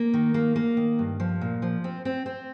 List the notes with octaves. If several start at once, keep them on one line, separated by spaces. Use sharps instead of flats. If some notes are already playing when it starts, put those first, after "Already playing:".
Already playing: A#3
D#3
A#3
A#3
D#3
G2
F3
A#2
F3
C4
C4
C4